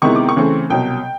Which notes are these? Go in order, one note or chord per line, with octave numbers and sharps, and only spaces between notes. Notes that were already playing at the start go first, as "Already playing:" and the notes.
C3 D#3 G#3 B3 E4 C#6
D6
C#6
C#3 E3 A3 C4
C2 B2 F#3 G5